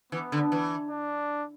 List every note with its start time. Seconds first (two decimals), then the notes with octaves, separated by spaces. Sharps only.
0.12 E3 B3
0.32 D3
0.52 E3
0.90 D4